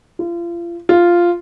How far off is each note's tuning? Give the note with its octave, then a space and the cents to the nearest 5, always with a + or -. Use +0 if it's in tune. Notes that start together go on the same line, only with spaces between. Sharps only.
F4 -35
F4 -5